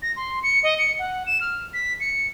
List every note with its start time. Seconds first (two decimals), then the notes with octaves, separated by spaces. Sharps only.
0.02 A#6
0.16 C6
0.43 C#7
0.63 D#5
0.78 C#7
0.99 F#5
1.27 E7
1.41 F6
1.74 B6
2.00 C#7